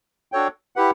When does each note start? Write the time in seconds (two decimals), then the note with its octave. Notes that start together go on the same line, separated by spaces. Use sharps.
0.32 D4 F#4 A4 C#5 G5
0.76 E4 G4 B4 F#5